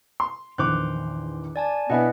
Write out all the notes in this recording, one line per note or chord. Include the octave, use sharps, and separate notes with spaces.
C6
A#1 E2 D#3 C5 C6 D6 F#6
D5 G#5 A5
B2 B3 D4 E4 D#5 F#5 G#5